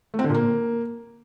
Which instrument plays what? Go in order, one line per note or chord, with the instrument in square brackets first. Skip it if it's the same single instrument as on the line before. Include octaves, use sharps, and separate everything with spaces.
[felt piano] A3
C4
D3
A#2
A#3